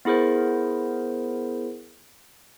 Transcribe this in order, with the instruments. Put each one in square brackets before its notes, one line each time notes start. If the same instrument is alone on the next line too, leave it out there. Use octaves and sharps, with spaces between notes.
[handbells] B3 E4 G#4 A#4 C5